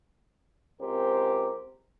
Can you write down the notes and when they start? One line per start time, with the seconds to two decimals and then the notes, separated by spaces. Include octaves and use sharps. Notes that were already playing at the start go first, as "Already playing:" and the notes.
0.81 C#2 C4 G4 A#4 C5